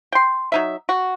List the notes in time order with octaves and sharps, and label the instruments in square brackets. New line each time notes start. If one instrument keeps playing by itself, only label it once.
[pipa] G5 C6
F#3 D#4 E5
F#4